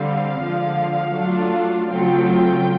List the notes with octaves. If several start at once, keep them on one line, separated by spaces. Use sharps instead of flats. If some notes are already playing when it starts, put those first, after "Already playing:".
Already playing: D3 G3 C4 F5
D3 F3 G#3
F#3 A3 D4 F4
C#3 F#3 A3 C4 F4 G5